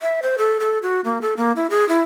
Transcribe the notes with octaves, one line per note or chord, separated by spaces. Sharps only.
E5
C5
A4
A4
F#4
A#3
A4
A#3
E4
G#4
E4